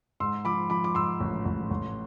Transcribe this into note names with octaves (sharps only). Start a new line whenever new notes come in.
G#2 C6 E6
F3 B5 D6
F3 B5 D6
D6
G#2 C6 E6
A1
A1
A1